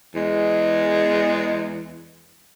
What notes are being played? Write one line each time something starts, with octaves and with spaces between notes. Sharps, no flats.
E2 G#3